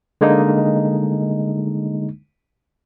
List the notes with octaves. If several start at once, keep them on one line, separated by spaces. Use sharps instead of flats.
D3 G#3 A#3 D4 D#4